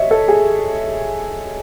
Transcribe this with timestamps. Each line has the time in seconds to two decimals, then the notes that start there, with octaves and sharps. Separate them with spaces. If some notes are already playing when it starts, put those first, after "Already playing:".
Already playing: C#5 D#5 E5
0.11 A4
0.28 G#4